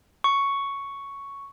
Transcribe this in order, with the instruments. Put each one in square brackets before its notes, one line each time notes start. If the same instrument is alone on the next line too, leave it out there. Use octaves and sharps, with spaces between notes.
[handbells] C#6